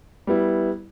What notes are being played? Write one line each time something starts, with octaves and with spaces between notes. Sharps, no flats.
G3 B3 E4